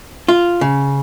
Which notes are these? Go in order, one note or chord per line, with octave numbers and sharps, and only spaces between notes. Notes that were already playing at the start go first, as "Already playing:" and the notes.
F4
C#3